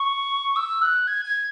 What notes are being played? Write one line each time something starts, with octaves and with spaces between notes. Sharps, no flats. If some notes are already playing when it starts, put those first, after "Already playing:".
Already playing: C#6
E6
F#6
G#6
G#6